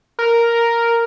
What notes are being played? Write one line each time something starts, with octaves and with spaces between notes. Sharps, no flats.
A#4